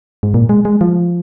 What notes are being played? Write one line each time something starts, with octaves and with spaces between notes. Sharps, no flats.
G#2
A#2
G#3
G#3
F3